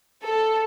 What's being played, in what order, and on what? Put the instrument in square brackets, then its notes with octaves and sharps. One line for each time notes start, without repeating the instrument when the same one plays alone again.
[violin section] A4